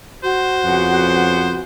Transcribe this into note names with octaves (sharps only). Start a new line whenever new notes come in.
F#4 C5
F2 C#3 B3 F#5